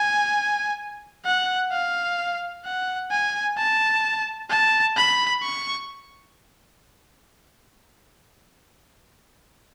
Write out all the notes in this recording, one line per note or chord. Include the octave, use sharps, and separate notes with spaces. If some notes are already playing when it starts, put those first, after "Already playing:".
Already playing: G#5
F#5
F5
F#5
G#5
A5
A5
B5
C#6